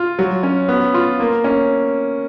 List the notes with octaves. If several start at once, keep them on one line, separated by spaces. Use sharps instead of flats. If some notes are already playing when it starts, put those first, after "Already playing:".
Already playing: F4
F#3
C#4
B3
F4
A#3
C#4